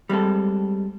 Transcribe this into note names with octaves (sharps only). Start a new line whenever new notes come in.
G3 G#3 C4 A4